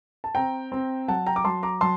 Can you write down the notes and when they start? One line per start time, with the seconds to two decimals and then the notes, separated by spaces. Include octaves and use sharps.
0.24 A5
0.35 C4 G5 A#5
0.72 C4
1.08 F#3 F#5 A5
1.26 G5 A#5
1.36 D6
1.45 F#3 A5 C6
1.63 A#5 D6
1.81 F#3 A5 C6